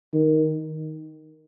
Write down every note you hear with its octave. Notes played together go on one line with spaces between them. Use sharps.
D#3